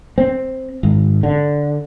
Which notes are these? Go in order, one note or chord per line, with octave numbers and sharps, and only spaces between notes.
C4
G#1
D3